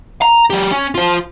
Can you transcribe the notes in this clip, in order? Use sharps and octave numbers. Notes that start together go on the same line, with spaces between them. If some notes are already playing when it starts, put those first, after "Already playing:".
A#5
F#3 G4
C#4
F4 C5